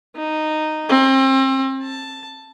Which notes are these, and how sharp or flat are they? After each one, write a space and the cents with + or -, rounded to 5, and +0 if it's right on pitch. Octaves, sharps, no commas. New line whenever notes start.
D#4 -10
C4 +35
A5 +5